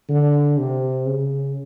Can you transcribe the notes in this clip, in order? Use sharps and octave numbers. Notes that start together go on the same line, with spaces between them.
D3
C3
C#3